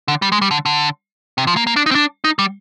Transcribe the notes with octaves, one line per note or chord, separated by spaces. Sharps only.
D3
G3
G#3
G3
D3
D3
C3
F3
A#3
A#3
D4
D#4
C4
D4
D#4
G3